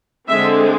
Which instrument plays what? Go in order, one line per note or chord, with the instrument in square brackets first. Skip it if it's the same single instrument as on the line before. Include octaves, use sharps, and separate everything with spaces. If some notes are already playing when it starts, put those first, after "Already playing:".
[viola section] D3 G#3 C4 E5